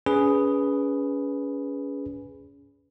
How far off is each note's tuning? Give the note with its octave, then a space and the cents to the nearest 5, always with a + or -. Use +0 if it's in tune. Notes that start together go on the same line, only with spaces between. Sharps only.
C#4 +30 G#4 +0 B4 +0